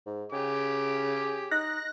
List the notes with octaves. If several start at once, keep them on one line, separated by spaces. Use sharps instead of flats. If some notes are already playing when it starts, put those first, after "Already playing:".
G#2
C#3 G4 G#4 D6
D#4 F#6 A#6